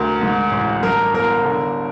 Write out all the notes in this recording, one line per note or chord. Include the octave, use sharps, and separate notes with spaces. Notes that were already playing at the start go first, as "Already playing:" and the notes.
Already playing: D2 A#4
G#2
A1
G2 A#4
G1 A#4
D3